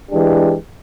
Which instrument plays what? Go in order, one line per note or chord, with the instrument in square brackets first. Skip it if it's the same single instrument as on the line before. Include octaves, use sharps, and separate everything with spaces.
[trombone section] E3 G#3 D4 G4